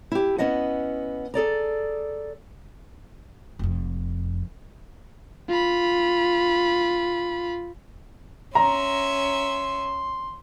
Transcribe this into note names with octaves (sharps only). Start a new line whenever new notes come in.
E4 G4
B3 C#4 E4 D#5 F#5
G#4 A4 D5 A#5
F1 F2
F4 B5
C#4 E5 A#5 C6